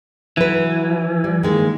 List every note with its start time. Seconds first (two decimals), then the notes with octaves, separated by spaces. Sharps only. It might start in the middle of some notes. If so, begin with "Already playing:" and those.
0.37 E3 F#3 B4
1.24 G3
1.43 D#3 G#3 A#3